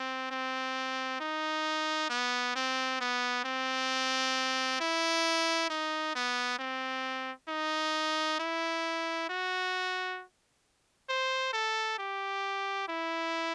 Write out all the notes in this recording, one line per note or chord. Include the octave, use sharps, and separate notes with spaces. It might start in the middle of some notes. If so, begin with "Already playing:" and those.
Already playing: C4
C4
D#4
B3
C4
B3
C4
E4
D#4
B3
C4
D#4
E4
F#4
C5
A4
G4
E4